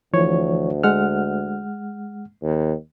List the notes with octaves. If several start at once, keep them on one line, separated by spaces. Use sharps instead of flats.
D2 E3 F3 C#5
G#3 F#5 F6
D#2